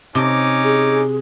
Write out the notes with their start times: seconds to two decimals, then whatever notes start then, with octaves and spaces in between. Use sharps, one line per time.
0.15 C3 C#4 D#4 D6
0.64 G#4